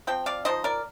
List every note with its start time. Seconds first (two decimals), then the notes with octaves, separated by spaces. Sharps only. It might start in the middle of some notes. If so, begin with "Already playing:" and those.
0.07 F3 C4 G5
0.26 D5 F5
0.45 F3 C4 D#4 C5 D#5
0.64 A#4 D5